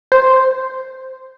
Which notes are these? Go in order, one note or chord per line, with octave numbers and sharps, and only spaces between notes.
C5